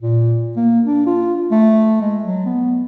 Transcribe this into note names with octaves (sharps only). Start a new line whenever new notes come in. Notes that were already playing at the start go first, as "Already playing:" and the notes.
A#2
A#3
D4
F4
A3
G#3
F#3
B3